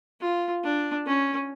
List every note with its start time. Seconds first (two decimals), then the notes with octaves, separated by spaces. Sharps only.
0.21 F4
0.64 D4
1.06 C#4